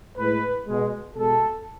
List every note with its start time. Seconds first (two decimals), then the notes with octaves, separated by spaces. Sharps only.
0.17 A2 G#3 B4
0.67 B2 G#3
1.16 B2 G#3 A4